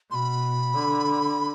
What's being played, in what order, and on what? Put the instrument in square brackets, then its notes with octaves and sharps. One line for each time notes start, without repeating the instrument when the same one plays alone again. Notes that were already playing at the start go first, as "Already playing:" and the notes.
[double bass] B2 [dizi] B5 C6
[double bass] D3